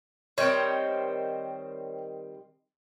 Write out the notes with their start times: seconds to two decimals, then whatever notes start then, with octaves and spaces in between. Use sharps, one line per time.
0.38 D#3 G3 C4 C#5 D#5